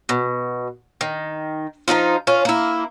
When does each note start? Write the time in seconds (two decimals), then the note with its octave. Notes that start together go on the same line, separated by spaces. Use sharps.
0.09 B2
1.01 D#3
1.88 F3 A3 D#4 F4
2.27 C#4 F4
2.45 A#3 E4